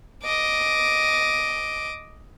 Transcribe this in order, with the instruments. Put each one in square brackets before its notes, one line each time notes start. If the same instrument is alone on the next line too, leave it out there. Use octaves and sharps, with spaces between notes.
[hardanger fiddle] D#5 D6